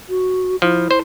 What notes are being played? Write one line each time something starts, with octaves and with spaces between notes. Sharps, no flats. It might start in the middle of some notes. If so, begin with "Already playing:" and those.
F#4
F3 E4
C5